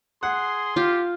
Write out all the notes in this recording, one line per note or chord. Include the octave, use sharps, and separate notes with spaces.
G#4 F#5 C6
F4 G4